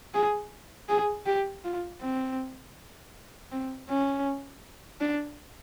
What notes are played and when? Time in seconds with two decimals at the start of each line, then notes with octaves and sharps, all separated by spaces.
0.14 G#4
0.89 G#4
1.26 G4
1.64 F4
2.01 C4
3.52 C4
3.89 C#4
5.01 D4